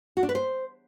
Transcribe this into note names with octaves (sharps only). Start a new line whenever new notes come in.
F#4
D4
B4
C5